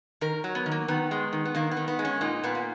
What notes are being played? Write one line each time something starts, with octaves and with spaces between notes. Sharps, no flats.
D#3 A#4
F#3
B3
D#3
A#3
D#3 B3
G#3
D#3
B3
D#3 A#3
B3
D#3
B3
G#3
C#4
A#2 D#4
A#2 B3
A#3